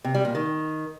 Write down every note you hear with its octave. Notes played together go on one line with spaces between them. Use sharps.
C3
G3
A#2
D#3